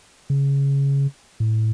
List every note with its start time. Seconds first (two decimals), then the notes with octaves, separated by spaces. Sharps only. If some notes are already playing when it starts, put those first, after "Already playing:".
0.30 C#3
1.40 A2